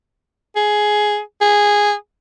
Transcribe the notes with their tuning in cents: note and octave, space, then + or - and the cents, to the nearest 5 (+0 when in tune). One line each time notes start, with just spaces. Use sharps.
G#4 +10
G#4 -10